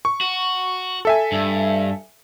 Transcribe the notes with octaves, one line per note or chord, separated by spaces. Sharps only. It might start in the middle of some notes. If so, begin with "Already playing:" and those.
C#6
F#4
A4 E5 G#5
G2